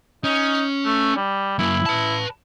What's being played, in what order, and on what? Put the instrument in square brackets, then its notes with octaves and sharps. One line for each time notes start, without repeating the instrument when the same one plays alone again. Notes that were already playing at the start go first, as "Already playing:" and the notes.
[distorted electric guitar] C#4 [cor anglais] D#4
[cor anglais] A3
G3
[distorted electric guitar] F#2 A#3 [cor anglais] E4
[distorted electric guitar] B4 A5